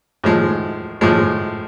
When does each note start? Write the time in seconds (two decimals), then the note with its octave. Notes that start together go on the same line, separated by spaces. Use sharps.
0.24 A2 F3 G#3
1.01 A2 F3 G#3